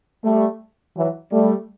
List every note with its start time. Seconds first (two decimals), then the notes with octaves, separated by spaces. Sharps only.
0.25 G3 A3
0.97 E3 F#3
1.33 G3 A3